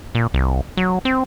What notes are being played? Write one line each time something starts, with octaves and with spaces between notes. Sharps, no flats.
A#2
C2
F#3
C4